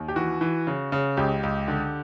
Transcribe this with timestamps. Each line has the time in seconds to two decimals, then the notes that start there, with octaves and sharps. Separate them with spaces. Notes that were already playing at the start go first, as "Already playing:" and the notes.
Already playing: D#2
0.08 G4
0.16 E3 F#4
0.41 E3
0.67 C#3
0.92 C#3
1.17 C#2 G4
1.43 C#2
1.68 D3